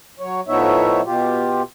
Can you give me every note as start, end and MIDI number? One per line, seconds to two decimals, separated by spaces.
0.20 0.41 54
0.20 0.41 73
0.48 1.01 45
0.48 1.01 53
0.48 1.01 59
0.48 1.01 63
0.48 1.01 73
0.48 1.01 76
1.05 1.62 47
1.05 1.62 65
1.05 1.62 67